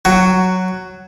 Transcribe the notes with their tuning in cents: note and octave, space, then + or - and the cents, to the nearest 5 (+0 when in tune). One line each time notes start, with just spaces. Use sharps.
F#3 +0 F#4 +10